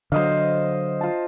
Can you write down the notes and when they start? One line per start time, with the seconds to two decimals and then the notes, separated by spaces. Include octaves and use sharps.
0.12 D3 F#3 C5 D#5 F5
1.01 F4 A5